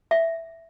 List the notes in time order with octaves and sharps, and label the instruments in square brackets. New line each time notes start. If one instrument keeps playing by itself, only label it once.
[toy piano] E5